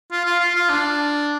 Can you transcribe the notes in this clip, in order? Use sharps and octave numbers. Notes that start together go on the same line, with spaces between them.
F4
F4
F4
F4
D4